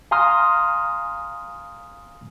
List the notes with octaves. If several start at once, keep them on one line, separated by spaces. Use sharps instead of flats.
F5 G#5 A#5 C6 D#6 F6